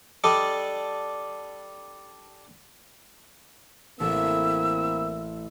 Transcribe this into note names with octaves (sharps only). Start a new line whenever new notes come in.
G3 D4 A4 D#5
A1 A#3 C4 E4 A4 E6